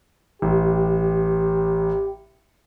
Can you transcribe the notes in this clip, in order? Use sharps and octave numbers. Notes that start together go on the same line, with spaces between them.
A1 G4